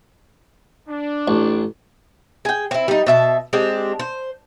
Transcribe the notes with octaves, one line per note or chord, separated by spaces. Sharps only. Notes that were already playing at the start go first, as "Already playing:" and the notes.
D4
A1
G#4 G5
C4 E4
G3 D#4
B2 E5 A5
G#3 C4 D4 G4
C5